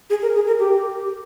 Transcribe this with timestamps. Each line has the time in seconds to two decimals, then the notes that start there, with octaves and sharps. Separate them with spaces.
0.10 G#4
0.22 A#4
0.35 G#4
0.47 A#4
0.59 G4